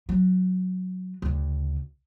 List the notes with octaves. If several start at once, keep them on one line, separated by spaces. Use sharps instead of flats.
F#3
D2 C#3